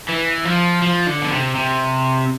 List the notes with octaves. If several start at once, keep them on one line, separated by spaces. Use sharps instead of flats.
E3
F3
F3
D3
B2
C3
C3